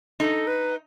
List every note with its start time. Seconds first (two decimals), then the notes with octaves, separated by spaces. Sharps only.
0.20 D#4 A4
0.47 B4